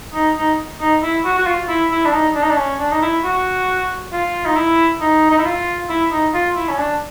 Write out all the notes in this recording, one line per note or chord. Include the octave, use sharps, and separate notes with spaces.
D#4
D#4
D#4
E4
F#4
F#4
F4
E4
E4
D4
D#4
D4
D#4
D4
C#4
D4
D#4
E4
F#4
F4
D#4
E4
D#4
D#4
E4
F4
E4
D#4
F4
E4
C#4
D4